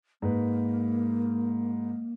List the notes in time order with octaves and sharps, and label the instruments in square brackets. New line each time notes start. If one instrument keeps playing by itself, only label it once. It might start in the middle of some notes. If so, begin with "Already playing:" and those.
[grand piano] G#2 B4 [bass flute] A#3